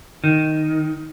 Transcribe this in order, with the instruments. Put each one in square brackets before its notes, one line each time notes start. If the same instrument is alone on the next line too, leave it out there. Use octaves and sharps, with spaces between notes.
[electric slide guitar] D#3